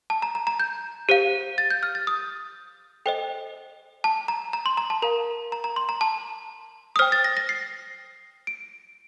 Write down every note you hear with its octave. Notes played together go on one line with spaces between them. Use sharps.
A5
A#5
A#5
A#5
G6
G4 C5 F5
A6
G6
F6
A6
D#6
A4 C5 D#5 G5
A5
A#5
A#5
C6
A#5
A5
A#4 F5 A#5
A#5
A#5
C6
A#5
A5
D#6
C5 G5 F6
A6
A#6
A#6
C7
D7